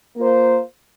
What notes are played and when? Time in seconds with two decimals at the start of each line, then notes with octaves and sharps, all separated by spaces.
0.17 A#3 F4 C5